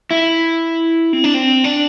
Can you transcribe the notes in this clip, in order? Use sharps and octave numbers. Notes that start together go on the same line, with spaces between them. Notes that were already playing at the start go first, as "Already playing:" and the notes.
E4
C4
D4
C4
D4